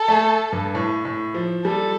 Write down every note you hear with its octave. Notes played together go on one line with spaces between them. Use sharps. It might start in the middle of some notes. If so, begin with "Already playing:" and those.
Already playing: A4
A3
G2
A2
A2
F3
G3 A4